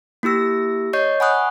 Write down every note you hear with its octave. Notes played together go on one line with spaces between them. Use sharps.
A#3 E4 G4 E6 A#6
C#5 D#5 C#6 G6 C7
F#5 G#5 B5 C#6 D#6 F#6